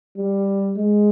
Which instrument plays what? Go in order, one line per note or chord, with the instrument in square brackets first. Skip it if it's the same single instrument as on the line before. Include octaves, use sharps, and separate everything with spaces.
[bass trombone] G3
G#3